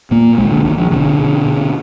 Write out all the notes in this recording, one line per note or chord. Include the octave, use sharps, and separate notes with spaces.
A#2 A#3
A#1 G#3
D#3
D3
A#1 D#3
F3
B2 D3
B2
B2